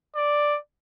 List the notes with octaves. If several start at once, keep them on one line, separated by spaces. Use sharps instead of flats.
D5